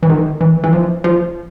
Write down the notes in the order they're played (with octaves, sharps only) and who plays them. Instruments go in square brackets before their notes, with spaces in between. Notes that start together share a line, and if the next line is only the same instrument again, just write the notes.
[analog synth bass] E3
D#3
E3
E3
F3
F3